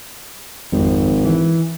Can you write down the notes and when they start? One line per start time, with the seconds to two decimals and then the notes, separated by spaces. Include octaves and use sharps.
0.72 G#1 F2
1.24 E3